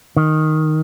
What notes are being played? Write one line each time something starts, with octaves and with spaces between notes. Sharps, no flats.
D#3